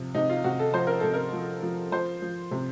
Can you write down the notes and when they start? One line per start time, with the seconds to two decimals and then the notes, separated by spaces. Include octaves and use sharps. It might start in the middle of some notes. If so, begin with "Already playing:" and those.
Already playing: C3 F3
0.14 C3 D#4
0.30 F4
0.44 C3 F#4
0.59 A4
0.74 F3 C5
0.87 A#4
1.00 C3 A4
1.13 A#4
1.33 F3
1.62 F3
1.92 F3 C5
2.22 F3
2.51 C3